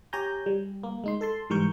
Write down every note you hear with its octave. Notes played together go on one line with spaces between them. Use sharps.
G4 C#5 G#5 A#5 G6
G3
A#3
G#3 D#4 C6
A4 A5 C6
G#2 E3 G3 A#4 C#6 G6